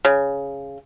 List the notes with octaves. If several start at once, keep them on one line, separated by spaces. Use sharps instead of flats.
C#3